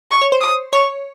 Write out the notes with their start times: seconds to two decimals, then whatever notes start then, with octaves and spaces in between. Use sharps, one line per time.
0.11 C#6
0.21 C#5
0.32 C5
0.41 D#6
0.73 C#5 C#6